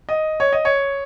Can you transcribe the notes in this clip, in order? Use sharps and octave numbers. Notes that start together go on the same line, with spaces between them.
D#5
C#5
D#5
C#5